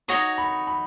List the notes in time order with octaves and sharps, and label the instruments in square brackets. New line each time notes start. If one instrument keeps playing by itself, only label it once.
[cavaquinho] D#4 F#4 C#5 [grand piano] D#6
[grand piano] B5
B5